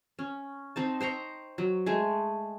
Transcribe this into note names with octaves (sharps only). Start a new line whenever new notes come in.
C#4
C4 D#4 A5
C5 G5 A#5 C#6
F#3
G#3 A3 G#5